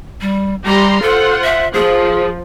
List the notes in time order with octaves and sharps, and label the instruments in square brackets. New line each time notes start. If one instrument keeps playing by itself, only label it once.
[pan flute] G3
[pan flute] G3 [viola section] G4 A#5 C6
[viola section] F4 C5 F#5 [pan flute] A4
[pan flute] E5
[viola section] F3 [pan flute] G#4